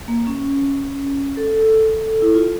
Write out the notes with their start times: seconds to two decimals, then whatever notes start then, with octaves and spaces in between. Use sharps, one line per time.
0.08 A#3
0.27 C#4
1.37 A4
2.22 E4
2.35 F4